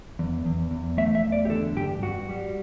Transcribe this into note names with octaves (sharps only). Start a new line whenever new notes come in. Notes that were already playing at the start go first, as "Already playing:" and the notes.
E2
E2
E2
A3 E5
E5
E2
D5
G4
D3 A4
G2 G4
G2 F#4
G3